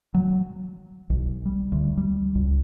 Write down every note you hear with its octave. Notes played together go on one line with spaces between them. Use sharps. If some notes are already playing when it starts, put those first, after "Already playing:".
F#3
B1
G3
D2
G3
C#2